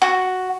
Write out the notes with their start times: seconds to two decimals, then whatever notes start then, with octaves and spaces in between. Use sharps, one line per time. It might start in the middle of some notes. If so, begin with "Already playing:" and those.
0.02 F#4